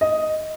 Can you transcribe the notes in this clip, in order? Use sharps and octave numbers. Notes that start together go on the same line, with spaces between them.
D#5